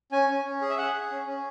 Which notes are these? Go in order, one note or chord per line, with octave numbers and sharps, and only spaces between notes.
C#4 G#5
C#4
C#4
G#4
E5
G#4 F#5
G#4
C#4
C#4